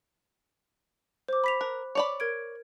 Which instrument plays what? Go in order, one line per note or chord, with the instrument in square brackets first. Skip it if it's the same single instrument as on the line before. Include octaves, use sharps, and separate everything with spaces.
[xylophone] C5 D6
B5 B6 F7
[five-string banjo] A#4 [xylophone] F#6
[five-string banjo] C#5 D5 B5
[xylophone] A#4 G#6 D7